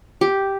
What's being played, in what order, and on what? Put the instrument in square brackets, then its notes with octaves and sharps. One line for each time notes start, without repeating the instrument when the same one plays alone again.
[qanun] G4